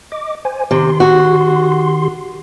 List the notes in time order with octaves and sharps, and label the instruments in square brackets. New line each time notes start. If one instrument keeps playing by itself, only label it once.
[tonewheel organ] D#5 D6
C5 G#5
[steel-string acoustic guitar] C3 [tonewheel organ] D#3 G4 C6
[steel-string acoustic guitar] F#4